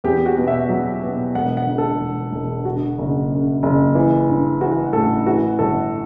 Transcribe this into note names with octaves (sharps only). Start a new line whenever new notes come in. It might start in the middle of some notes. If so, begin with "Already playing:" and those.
E2 G4
F#4
B2
E5
F#3
B2
E1 F#5
F#5
D3
A4
E1
E1
D3 F#4
F#1
F#2
F#1
E3
G2
E3 F#4
A1 A4
E3 F#4
G1 A4